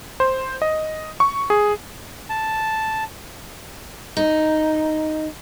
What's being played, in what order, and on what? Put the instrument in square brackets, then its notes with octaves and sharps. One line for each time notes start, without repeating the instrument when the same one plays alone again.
[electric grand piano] C5
D#5
C#6
G#4
[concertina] A5
[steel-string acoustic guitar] D#4